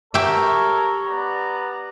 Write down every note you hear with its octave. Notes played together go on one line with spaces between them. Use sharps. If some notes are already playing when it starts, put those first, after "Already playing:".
G4 A4 A#4 C#5 E5
B3 D5 A#5